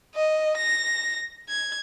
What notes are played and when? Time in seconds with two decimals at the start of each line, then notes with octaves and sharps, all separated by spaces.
0.15 D#5
0.57 A#6
1.49 G#6